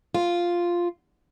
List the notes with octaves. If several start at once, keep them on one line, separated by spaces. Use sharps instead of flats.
F4